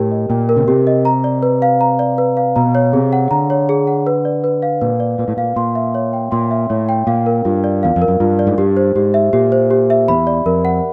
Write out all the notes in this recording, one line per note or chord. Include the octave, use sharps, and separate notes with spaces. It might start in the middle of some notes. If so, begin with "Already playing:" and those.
Already playing: A2 G4 A#4 G5
D#5
A#2 G5
A#4
C#3
C3 G4
D#5
A#5
D5
B4
F5
A#5
D5
B4
F5
B2 A#5
C#5
C3 G#4
F#5
D3 A#5
C#5
G#4
F#5
B4
D5
B4
F5
A#2 B4
D5
A#2 B4
A2
A#2 F5
A#2 C6
E5
C#5
G5
A#2 C6
E5
A2 C#5
G5
A#2 F5
A#4
G2 F4
D5
E2 F5
F2
A#4
F#2
G2 F4
D5
G#2
G2 G4
C5
G#2 G4
E5
A#2 G4
C5
G4
E5
E2 B5
D5
F2 A#4
F#5